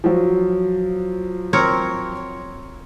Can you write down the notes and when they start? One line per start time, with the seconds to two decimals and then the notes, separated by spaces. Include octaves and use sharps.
0.04 F3 F#3
1.53 C4 A#4 C#5